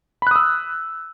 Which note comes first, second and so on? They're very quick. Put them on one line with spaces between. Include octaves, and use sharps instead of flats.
B5 F#6 D#6 E6